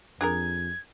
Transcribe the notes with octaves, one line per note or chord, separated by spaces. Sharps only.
F2 D4 G#4 A#4 G#6